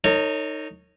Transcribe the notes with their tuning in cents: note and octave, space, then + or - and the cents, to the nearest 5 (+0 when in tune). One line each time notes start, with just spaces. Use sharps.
D#4 +0 A#4 -45 C#5 +0